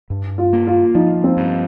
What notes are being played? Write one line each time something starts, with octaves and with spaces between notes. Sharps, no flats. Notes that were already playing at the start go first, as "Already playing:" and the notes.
G2
F4
A#3
F4
F3 D#4
C4
G2